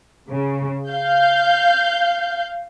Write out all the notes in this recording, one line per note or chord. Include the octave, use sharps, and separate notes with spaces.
C#3
F5 G6